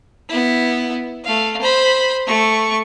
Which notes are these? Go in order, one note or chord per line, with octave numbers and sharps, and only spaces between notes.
B3 E4
A3 F5
C5 B5
A3 C#6